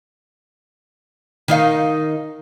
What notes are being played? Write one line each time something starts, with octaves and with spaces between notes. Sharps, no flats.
D#3 D#4 F5